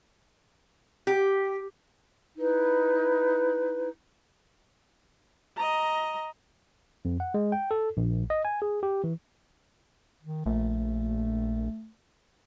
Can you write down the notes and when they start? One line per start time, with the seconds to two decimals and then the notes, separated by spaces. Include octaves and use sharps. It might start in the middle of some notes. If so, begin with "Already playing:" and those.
1.07 G4
2.38 D#4 E4 B4
5.57 D#5 A#5
7.05 F2
7.20 F#5
7.34 G#3
7.52 G5
7.71 A4
7.97 A#1
8.30 D#5
8.45 G#5
8.62 G#4
8.83 G4
9.04 E3
10.23 D#3
10.46 A#1 A3